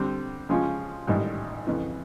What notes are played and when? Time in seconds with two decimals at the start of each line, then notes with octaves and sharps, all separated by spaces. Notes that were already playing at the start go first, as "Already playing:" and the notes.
Already playing: D3 G3 C4
0.49 C#3 F3 G#3 C#4 F4
1.07 A1 G#2 D#3 G3
1.67 F2 C#3 E3